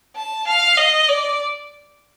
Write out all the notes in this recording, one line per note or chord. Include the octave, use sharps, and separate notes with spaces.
A5
F5
D#5
D5